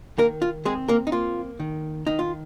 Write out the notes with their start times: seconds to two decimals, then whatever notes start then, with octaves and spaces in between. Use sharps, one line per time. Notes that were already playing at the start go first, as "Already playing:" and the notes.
0.18 D#3 A#3 A#4
0.42 F4
0.65 G#3 C4 G#4
0.88 A#3 A#4
1.07 D#4
1.12 A#3 F4
1.60 D#3
2.07 D#3 D#4
2.19 F4